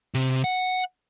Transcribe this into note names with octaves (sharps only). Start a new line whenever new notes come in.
C3
F#5